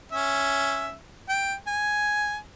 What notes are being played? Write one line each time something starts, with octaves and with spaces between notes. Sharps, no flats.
C#4 E5
G5
G#5